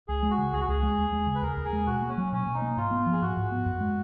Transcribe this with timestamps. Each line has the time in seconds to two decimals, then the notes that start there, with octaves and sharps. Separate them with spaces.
0.08 C#2 G#4
0.23 G#3
0.31 F#4
0.38 C#3
0.53 C#2 G#4
0.60 F#4
0.68 C#2 G#4
0.83 G#3
0.98 D#2
1.12 G#3
1.27 C#3
1.35 B4
1.42 D#2 A#4
1.57 D#2
1.65 G#4
1.73 G#3
1.86 B2 F#4
2.02 A#3
2.09 C#4
2.18 F#3
2.32 B2 C#4
2.47 B2
2.54 D#4
2.62 A#3
2.77 G#2 F4
2.91 B3
3.06 F3
3.12 G#4
3.22 G#2 F#4
3.37 G#2
3.52 B3
3.66 F#2
3.80 G#3